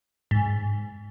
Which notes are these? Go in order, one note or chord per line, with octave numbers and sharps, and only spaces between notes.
G#2